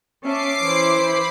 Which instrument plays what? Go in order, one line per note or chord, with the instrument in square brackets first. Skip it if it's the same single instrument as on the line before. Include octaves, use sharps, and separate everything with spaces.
[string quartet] C#4 E5 A5 [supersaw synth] D6 C7
[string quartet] E3 E4 C5
[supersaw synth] B5